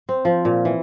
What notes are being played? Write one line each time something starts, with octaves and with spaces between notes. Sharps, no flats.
C4
F3
A#2
E3